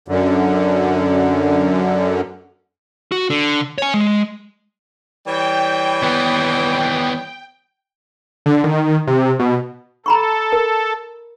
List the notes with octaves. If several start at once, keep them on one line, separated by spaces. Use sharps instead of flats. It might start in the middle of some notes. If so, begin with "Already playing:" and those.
F#2 D3
F#4
D3
C#5 G#5
G#3
E3 G3 C#5 G5
D#2 B3
D3
D#3
C3
B2
A4 A#5 B5 C#6
A#4